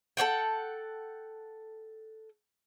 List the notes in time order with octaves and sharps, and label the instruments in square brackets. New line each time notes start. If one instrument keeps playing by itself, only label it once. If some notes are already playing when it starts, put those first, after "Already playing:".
[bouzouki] A4 C#5 F#5 G5